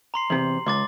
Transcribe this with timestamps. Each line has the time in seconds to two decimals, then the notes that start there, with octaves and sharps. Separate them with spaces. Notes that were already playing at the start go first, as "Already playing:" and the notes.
0.14 A#5 C6 C7
0.30 E2 C3 F#7
0.67 C#2 C6 D6 A6